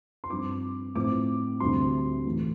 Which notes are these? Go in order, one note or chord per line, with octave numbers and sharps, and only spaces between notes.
C6
G2 F3 C4 D6
A2 F3 C4 D6
D2 C3 G3 C6
A2 E3 A3